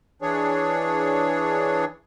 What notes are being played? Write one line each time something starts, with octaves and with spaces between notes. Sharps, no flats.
E3 D4 G#4 C#5